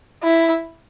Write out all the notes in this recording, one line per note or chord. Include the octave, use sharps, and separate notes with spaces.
E4